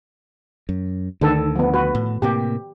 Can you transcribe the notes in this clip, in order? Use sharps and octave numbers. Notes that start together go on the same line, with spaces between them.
F#2
D2 D3 D#3 A4
F3 B3
F#4 B4
A2
A2 C3 A#3 G4